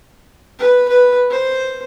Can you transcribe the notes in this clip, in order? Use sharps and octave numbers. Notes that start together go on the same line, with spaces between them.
B4
B4
C5